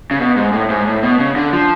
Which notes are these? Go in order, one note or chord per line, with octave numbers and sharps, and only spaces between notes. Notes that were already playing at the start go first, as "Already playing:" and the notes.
C#3
B2
G#2
A2
G#2
A2
B2
C#3
D3
F3